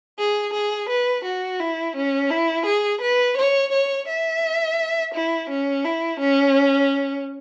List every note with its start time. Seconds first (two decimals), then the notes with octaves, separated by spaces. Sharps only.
0.19 G#4
0.54 G#4
0.90 B4
1.25 F#4
1.60 E4
1.97 C#4
2.31 E4
2.66 G#4
3.02 B4
3.38 C#5
3.73 C#5
4.09 E5
5.15 E4
5.50 C#4
5.85 E4
6.21 C#4